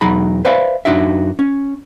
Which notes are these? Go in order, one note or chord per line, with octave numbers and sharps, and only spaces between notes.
B1 E2 F#3 D#4 A#5 B5
B4 C5 D5 E5 F5 B5
F#2 B2 D4 D#4 F#4 E5
C#4